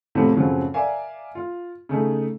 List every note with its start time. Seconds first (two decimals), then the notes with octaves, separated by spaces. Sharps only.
0.15 E2 A2 C3 F3 A3
0.34 F#2 A2 C#3 F3 F#3 C4
0.74 A#4 D5 E5 F5 G#5
1.35 F4
1.89 C#3 A3 D#4